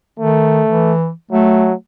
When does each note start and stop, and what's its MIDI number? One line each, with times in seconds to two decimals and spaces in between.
0.19 0.63 51
0.19 0.92 57
0.68 1.11 52
1.31 1.73 54
1.31 1.74 57